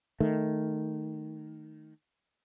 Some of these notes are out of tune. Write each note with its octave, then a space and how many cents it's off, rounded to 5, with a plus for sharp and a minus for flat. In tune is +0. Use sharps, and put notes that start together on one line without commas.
D#3 +0 A3 +0